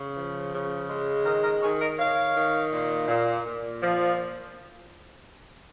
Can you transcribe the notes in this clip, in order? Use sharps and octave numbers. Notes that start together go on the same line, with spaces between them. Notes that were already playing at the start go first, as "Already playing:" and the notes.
Already playing: C#3
F3
C#3
G#3
D#3 A#4 D#5
A#4 D#5
D#3 G#4 C#5
A#4 D#5
D#3 C#5 F5
D#3
A#2
A#2
A#2
F3